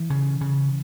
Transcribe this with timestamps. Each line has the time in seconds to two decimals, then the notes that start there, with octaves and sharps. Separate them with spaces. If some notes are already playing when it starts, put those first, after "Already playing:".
Already playing: E3
0.10 C#3
0.41 C#3